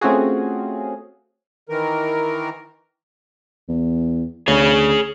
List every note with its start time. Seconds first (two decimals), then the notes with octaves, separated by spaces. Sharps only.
0.01 A3 C4 C#4 F4 F#4 G#4
1.69 D#3 E3 A#4
3.69 E2
4.48 D2 G#4 C#5